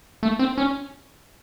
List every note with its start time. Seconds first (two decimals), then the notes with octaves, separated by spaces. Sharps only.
0.23 A3
0.39 C4
0.58 C#4